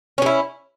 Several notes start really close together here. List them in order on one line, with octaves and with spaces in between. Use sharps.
C#4 G#4 E4